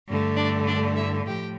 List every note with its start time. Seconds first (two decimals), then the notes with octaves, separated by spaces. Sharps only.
0.08 G2 D3 A3
0.37 D4 D5
0.67 D4 D5
0.96 E4 E5
1.26 A2 F3 G4 G5